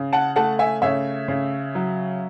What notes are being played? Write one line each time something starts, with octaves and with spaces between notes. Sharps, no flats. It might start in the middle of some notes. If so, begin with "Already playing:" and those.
Already playing: C#3
F#5 A5
A3 F#5 A5
E5 G#5
C#3 C#5 E5
C#3
F#3